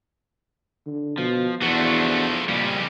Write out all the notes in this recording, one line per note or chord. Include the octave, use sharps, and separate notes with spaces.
D3
B2 F3
E2 F3 A3 D4 F#4
F2 A#2 C#3 G3